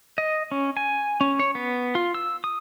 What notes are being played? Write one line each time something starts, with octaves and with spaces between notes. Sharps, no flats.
D#5
C#4
G#5
C#4
C#5
B3
F4
E6
D#6